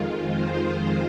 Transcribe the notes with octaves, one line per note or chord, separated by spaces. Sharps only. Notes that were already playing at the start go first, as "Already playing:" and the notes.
Already playing: F2 D#3 G#3 F4
C5